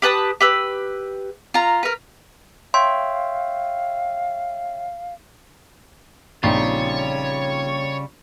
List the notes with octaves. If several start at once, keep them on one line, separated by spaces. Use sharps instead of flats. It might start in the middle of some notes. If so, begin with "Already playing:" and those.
G4 B4 A5 D#6
G4 B4 E6
F4 A#5
A#4 B4
C#5 E5 F5 G5 C6
A#1 C#3 G3 C4 D#4 F4 C#5